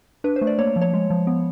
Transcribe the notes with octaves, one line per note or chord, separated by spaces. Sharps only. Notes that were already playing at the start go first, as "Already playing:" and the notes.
D4 B4
C5
A3
D5
A#3 C#5
F3
C#5
G#3
F3
B3